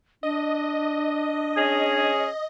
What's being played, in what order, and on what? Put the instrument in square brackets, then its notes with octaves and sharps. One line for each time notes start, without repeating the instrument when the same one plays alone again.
[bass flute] D4 [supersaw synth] D#5
[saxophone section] C#4 G#4